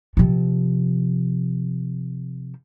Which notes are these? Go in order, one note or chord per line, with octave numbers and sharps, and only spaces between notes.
C3 F3